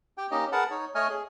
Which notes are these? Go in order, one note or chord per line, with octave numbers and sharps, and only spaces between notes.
G4 G5
A#3 C#4 D#4 G4 D#5
G#4 A#4 B4 F#5 A5
D#4 C#5
A3 C#5 D#5 G#5 F6
G#4